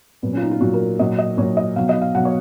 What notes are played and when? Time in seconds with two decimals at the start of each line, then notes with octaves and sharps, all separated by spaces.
0.22 A#2 F#3 B3
0.33 C#4
0.37 F4
0.42 D#4
0.51 F4
0.60 A#2 F#3 F#4
0.74 A#4
0.99 A#2 F#3 D#5
1.19 D#5
1.37 A#2 F#3 C#5
1.57 D#5
1.76 B2 F#3 F5
1.89 D#5
2.02 F5
2.15 B2 F#3 F#5
2.25 C#5